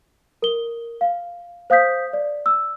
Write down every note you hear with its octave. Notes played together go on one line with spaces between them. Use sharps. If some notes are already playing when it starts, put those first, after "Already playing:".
A#4 G7
F5
C5 F5 D#6 G6 B6
D5
E6